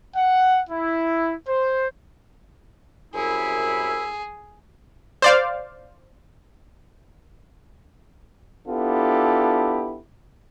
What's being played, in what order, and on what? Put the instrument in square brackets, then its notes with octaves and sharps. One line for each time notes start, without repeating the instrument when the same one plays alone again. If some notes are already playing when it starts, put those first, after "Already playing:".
[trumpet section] F#5
E4
C5
[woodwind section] C2 F#2 E4 [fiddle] G#4
[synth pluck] C5 D5 F5
[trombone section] B3 D4 E4 F4 G4 A4